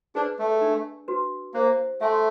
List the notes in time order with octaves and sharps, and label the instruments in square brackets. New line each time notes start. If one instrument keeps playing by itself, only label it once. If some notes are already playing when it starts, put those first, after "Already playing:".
[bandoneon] D4 [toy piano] G#4 B4 D5
[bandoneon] A3
[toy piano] D4
F#4 B4
[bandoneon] A#3 [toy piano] C5
[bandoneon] A3 [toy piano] E5 G#5 C6